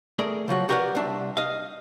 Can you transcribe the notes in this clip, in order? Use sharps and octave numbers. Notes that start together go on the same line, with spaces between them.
A3 G#4 A#4 D5
C#3 F3 F#3 F#4
F#4 G4 A#4 B4 D5 F#5
C2 D4 E5
D#5 F5